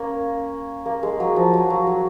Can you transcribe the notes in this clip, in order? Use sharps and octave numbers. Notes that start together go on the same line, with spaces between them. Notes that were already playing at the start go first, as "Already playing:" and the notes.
Already playing: A#3 C#4
A#3
G#3
F#3
F3
F#3
F#3
F#3